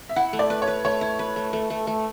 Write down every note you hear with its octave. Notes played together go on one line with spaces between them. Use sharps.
E5
E4 F#5
A3
D5
B4
C#5
B4
A3 C#5
E4
B4
A3
A3 A4
A3
A3